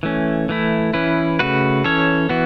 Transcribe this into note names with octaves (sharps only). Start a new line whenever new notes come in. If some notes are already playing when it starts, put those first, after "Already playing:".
E3 A3 C#4
E3 A3 E4
E3 C#4 E4 B4
C#3 A3 F#4 B4
E3 C#4 A4 C#5
E3 B3 F#4